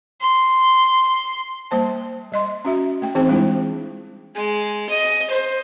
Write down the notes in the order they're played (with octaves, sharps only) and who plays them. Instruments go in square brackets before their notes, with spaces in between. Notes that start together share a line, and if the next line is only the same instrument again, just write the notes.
[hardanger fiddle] C6
[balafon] G3 A#3 C5 A5
G3 D#5 C6
C#4 F#4 E5
A3 G5
E3 C4 D#4 G#4 C5 G5
G3 G#3 D4 E4 F4
[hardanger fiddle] G#3
D#5
C5